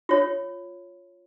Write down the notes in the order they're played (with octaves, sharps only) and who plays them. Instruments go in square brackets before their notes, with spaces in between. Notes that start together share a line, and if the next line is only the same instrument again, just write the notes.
[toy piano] F4 C#5